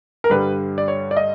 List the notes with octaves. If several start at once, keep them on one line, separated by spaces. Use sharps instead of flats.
A#4
G2 D3 G3 B4
D5
C#5
D5
D#5